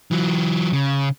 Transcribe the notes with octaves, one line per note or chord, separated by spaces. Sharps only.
E3 F#3
C#3